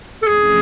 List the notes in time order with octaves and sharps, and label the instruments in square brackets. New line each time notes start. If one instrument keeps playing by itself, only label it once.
[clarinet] A4
[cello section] F2 C3 E3 A3 C#4 [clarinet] G#4